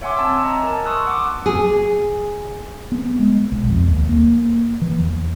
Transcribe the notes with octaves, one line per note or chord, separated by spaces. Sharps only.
C#5 E5 F#5 G#5 C6 D6
C4 A5 E6
D#5 G#5 A#5
A#4 A5
C6 C#6 D#6 E6 F#6
F#5 D6
G#4
B3
G#3
B1
F2
D#2
A#3
E3
E2